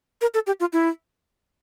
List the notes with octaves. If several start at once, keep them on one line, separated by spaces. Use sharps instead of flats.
A#4
A4
G4
F4
E4